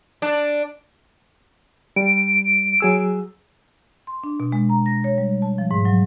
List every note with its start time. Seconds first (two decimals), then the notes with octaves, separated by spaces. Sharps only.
0.22 D4
1.96 G3 D7
2.80 F#3 G#4 E6
4.07 C6
4.24 D4
4.40 B2
4.52 G#3
4.69 A#5
4.86 A#6
5.04 C#5
5.18 G3
5.42 A5
5.58 F3
5.71 G#2
5.85 F#3